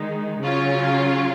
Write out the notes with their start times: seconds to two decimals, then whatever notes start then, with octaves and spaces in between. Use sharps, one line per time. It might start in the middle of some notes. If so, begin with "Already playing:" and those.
Already playing: D#3 G#3 D#4
0.41 C#3 F#3 C#4 F4